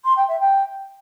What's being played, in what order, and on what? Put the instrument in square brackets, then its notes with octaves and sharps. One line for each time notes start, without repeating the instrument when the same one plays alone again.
[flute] C6
G5
E5
G5